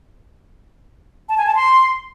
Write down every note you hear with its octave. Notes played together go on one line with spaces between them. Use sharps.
A5
G#5
A5
C6